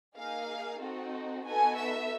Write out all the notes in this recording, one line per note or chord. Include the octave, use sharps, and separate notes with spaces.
A#3 D#4 G#4 F5
C4 D#4 F#4 A4
B3 D#4 F#4 A4 G#5
E5